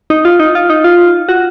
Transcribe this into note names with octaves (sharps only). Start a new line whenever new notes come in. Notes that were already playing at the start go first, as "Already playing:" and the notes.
D#4
F4
D#4
F4
D#4
F4
F#4